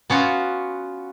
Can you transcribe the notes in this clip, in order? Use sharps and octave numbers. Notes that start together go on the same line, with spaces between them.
B3 C#4 F4 F#4